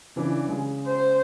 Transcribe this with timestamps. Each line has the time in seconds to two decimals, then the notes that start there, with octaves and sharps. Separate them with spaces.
0.16 C#3 E3 D4
0.47 C#3 G#3 G#4
0.87 C5